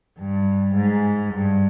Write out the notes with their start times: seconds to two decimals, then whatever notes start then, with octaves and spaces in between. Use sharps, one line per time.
0.19 G2
0.75 G#2
1.34 G2